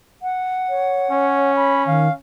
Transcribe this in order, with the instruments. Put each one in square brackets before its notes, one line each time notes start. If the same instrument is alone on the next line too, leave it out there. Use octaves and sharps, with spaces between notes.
[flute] F#5
[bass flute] C#5
[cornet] C#4
[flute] B5
[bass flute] D#3 [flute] F5